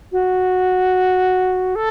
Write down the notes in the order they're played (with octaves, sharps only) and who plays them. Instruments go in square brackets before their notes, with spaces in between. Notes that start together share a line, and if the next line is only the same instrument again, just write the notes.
[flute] F#4
A4